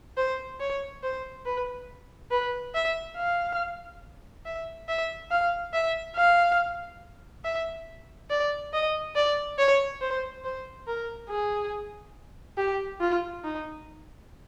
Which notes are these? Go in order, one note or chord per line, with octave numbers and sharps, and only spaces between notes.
C5
C#5
C5
B4
B4
E5
F5
E5
E5
F5
E5
F5
E5
D5
D#5
D5
C#5
C5
C5
A#4
G#4
G4
F4
D#4